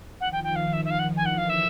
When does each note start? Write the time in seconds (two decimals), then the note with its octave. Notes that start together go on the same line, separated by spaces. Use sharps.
0.20 D#3 F3 F#5
0.32 G5
0.44 G5
0.56 F5
0.73 E5
0.85 E5
0.90 F5
0.99 F#5
1.17 G#5
1.25 D3 E3 F#5
1.38 F5
1.49 E5